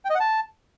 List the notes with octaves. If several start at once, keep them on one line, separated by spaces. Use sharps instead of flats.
G5
D#5
F#5
A5